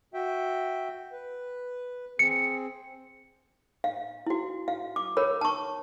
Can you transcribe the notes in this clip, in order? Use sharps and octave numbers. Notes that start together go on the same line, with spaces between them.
F#4 E5 G5
B4
C4 G#4 C#7
F5
E4 F#4
F5
D6
A#4 C#5 B5
A5 C#6